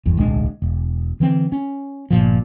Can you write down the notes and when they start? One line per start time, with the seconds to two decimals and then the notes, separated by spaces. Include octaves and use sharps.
0.05 G1 E2
0.17 D1 B1 G#3 D4
0.62 E1
1.20 D3 E3 C4
1.52 C#4
2.11 G1 A#2 F3